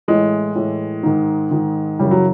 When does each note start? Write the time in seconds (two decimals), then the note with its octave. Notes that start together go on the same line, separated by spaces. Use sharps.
0.08 A2 E3 G#3
0.56 A2 E3
1.03 G#2 D#3
1.51 G#2 D#3
1.99 F#2 C#3 E3 G3
2.11 F#3